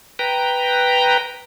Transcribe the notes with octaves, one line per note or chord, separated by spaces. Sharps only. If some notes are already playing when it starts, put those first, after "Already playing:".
B4 G5 A#5